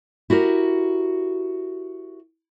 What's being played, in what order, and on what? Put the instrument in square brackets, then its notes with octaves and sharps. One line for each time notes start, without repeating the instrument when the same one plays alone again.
[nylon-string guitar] E4 F#4 G4 A#4